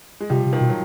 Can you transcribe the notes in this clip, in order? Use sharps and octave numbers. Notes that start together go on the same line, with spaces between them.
G#3
C3 F3 G3
C3
D#3 F3
B2
F#3